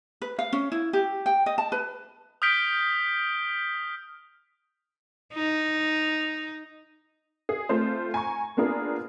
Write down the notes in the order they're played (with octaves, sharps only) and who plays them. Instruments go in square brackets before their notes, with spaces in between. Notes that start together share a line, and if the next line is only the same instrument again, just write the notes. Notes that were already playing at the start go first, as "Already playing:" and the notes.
[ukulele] B4
F5
C#4
E4
G4
G5
D#5
A5
B4
[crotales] D#6 F6 G6 B6 D7 G7
[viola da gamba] D#4
[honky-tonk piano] G#4
A3 C4 F4 C5
G#5 A#5 C#6
A#3 B3 D4 F4 G#4 A#4